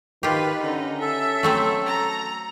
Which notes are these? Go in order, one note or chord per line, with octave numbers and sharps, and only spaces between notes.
D#3 F4 G4 B4
D3 C#4 D#4
A4 E5
F#3 A3 C4
A#5